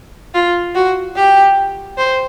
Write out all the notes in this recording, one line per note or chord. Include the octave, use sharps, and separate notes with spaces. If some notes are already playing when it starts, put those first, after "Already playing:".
F4
F#4
G4
C5